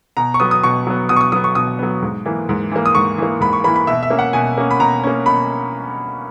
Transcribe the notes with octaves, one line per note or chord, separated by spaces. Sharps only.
B2 A#5
C#6
F#3 B3 D#6
D#6
B2 C#6
F#3 B3
B2 D#6
C#6
D#6
F#3 B3 D#6
C#6
B2 D#6
F#3 B3
G#2
E3 A#3
G#2
E3 A#3
D#6
G#2 C#6
E3 A#3
G#2 B5
C#6
E3 A#3 B5
B5
B2 E5
E5
A#3 C#4
F#5
B2 G#5
A#3 C#4
B5
B2 A#5
A#3 C#4
B2 B5